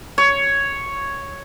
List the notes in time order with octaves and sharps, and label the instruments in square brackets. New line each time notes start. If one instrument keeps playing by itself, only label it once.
[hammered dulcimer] C#5